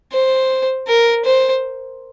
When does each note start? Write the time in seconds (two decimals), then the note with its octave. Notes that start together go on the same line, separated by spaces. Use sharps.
0.13 C5
0.88 A#4
1.25 C5